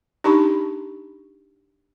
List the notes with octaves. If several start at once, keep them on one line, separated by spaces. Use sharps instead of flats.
D4 D#4 G4 A5 B5 C#6